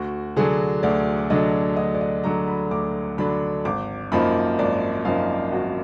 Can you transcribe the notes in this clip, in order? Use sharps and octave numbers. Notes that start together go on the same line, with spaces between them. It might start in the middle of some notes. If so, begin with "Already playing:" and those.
Already playing: D2 F#4
D3 F#3 D4 G#4
D2 D5
D3 F#3 D4 D#5
D2 D#5
D5
D#5
D3 F#3 D4 A#5
B5
D2 D6
D3 F#3 D4 B5
G#1 D6
F#2 F3 A#3 D#4 B5
G#1 D5
F#2 F3 A#3 D#4 F5
G#1 F#4